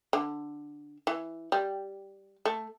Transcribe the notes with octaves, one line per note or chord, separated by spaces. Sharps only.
D3
E3
G3
A3